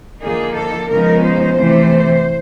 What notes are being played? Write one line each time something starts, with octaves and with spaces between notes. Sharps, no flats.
D3 F3 A#3 D#4 G#4
A4
C#3 F3 G#3 B3 D#4 A#4
C5
C3 E3 A3